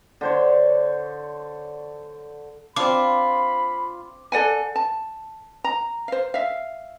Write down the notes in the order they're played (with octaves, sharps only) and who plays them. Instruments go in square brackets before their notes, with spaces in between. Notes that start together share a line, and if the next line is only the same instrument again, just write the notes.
[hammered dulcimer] D3 C5 C#5
[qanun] C4 D4 [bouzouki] F4 [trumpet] B5 [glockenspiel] D6
[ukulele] A4 D5 F#5 G#5
A5
A#5
C5 F5
E5 F5